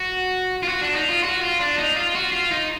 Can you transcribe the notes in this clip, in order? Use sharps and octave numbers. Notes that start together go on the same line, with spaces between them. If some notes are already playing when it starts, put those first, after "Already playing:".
Already playing: F#4
F4
F#4
D4
D#4
F4
F#4
F4
D4
D#4
F4
F#4
F4
D#4